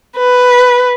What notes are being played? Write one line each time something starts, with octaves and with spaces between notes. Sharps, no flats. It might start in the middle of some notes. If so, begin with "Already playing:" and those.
B4